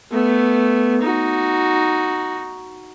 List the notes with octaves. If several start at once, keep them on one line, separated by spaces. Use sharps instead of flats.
A3 B3
D#4 F#4